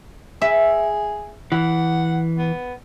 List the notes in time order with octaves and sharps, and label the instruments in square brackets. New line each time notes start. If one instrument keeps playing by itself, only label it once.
[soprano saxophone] G#4 [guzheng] E5
[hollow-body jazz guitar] E3 [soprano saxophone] F#5
[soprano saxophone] B3